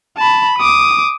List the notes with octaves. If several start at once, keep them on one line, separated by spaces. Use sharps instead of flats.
A5 B5
D6 D#6